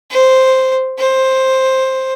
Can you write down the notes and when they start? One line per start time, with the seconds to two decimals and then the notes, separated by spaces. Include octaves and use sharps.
0.11 C5
0.99 C5